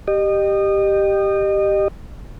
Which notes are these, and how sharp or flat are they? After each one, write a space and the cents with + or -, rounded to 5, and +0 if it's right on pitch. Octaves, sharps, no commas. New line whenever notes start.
G4 +0 D#5 -30